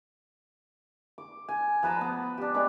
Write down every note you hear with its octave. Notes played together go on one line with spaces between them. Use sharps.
D6
G#5
F3 B4 A5 A#5
B3
D4 G4
G#3 D4 B4 C#5